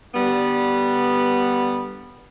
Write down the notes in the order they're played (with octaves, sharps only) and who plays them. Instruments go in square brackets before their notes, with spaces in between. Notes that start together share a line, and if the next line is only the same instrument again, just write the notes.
[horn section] D3 G3 B3